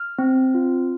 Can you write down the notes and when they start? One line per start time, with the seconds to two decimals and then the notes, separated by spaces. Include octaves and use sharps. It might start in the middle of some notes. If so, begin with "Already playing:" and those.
Already playing: F6
0.19 C4
0.54 F4